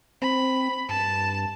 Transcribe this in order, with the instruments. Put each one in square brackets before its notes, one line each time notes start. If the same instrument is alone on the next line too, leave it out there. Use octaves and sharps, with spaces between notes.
[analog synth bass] C4 [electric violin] B5
[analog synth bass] G2 [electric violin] A5